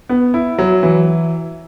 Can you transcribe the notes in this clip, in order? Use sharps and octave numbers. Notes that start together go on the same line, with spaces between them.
B3
E4
F#3
E3